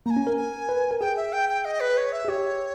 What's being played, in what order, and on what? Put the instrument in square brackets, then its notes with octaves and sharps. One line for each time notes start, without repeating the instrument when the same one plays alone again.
[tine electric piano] A#3 [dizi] A#5
[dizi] G#5
[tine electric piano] C#4
A#4
[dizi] G#5
[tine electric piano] B4
A#4
[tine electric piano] G#4 [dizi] G5
[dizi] E5
G5
G5
D#5
B4
C#5
E5
[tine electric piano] G#4
[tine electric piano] G4 [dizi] C#5